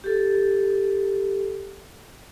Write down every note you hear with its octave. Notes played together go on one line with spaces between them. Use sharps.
G4 A4